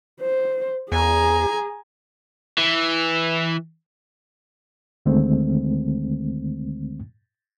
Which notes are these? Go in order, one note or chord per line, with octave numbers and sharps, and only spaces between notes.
C5
E2 G#4 G#5 A#5
E3
D2 D3 D#3 G#3 A3 C4